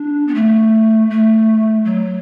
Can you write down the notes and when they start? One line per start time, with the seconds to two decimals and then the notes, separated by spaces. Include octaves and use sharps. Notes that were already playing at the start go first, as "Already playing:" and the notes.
Already playing: D4
0.27 B3
0.35 A3
1.10 A3
1.85 F#3